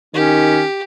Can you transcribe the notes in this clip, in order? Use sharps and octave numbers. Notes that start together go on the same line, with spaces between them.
D#3 C#4 G4